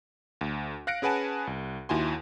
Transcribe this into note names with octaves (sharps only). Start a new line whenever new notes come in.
D2
F5 F#6 A#6 C#7 D7
C#4 G#4 B4 F#5 G#5 A5
C2
D#2 E4 F#4 G#5 C6